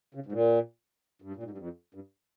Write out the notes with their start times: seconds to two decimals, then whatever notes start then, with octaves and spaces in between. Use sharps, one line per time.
0.14 C#3
0.26 G#2
0.32 A#2
1.22 G2
1.36 A#2
1.43 G#2
1.51 G2
1.58 F2
1.94 G2